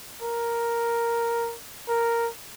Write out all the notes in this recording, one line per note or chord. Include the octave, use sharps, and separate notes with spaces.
A#4
A#4